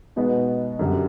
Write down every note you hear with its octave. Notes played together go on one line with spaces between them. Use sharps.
B2 G#3 B3 D#4
F#2 D3 G3